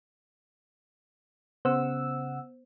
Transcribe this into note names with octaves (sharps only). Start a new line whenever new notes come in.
C#3 B3 C5 F#5 E6